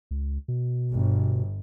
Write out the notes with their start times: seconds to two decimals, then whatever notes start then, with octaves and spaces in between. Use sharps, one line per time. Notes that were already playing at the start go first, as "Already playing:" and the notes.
0.11 C#2
0.48 B2
0.92 G1